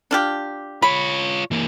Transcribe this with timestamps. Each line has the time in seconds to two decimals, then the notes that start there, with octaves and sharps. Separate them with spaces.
0.11 D4 F4 G4
0.82 F4 C#5 B5
1.51 E3 A#3